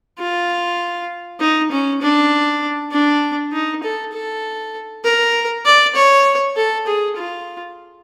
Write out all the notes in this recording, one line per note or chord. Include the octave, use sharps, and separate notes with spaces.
F4
D#4
C#4
D4
D4
D#4
A4
A4
A#4
D5
C#5
A4
G#4
F4